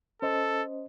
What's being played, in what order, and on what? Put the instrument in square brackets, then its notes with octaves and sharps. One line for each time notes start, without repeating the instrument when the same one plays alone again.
[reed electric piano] C#4 C5 D#5 [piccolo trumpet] A4